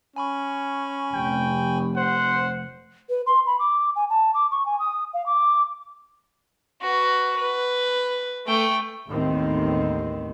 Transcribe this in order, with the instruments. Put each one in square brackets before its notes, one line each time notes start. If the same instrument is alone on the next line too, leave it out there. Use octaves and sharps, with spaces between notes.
[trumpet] C#4 [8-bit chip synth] G#5 B5 C#6
[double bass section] F1 [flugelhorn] G5
[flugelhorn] C5 [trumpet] F#5
[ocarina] B4
C6
B5
D6
G#5
A5
D6
C#6
G#5
D#6
F5
D6
[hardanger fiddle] F#4 B4
B4
A3 G5
[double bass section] A1 D#2 D#3 A3 B3 C4